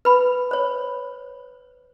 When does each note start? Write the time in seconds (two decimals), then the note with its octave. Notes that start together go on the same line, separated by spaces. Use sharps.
0.05 B4 B5
0.51 C5 C#5